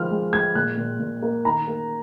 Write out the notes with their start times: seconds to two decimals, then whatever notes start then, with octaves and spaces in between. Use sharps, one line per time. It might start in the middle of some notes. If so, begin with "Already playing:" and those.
Already playing: D#3 F3 G#3 F6
0.11 G#3
0.32 G#3 G#6
0.55 A#2 F#6
0.78 A#2
0.99 A#2
1.22 A#3
1.45 D#3 A#5
1.68 A#3